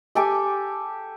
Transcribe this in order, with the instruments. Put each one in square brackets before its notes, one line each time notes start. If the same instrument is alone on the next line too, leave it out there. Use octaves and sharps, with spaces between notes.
[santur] G4 A4 G#5 D6